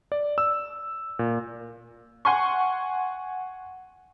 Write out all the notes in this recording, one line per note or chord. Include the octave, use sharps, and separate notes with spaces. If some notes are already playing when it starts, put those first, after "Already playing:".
D5
E6
A#2
F#5 G#5 C6 C#6